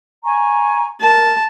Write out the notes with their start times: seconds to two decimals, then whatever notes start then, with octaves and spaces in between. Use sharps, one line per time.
0.24 G#5 A#5 C#6
1.01 A#4 A5